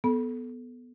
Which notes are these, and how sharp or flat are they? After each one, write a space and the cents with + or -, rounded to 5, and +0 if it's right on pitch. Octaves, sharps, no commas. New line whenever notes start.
B3 -5 A4 -15 B5 -30